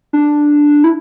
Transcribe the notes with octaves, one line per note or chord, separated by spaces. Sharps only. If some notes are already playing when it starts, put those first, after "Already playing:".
D4
E4